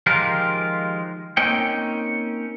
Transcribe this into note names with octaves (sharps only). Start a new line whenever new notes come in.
D#3 F3 G#3 F4 G4 A#4
A#3 C4 C#4 D#4 G5